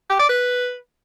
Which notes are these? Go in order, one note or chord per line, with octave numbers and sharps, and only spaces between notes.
G4
D5
B4